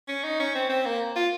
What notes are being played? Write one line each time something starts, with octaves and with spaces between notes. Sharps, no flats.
C#4
D#4
C#4
C4
C4
A#3
F4